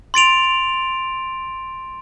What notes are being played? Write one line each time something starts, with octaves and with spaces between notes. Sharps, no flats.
C6 A6 D7 F7